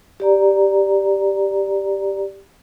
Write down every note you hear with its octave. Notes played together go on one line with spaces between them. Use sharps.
G4 D5 A#5